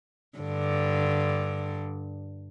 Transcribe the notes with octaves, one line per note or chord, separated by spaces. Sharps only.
G2 D3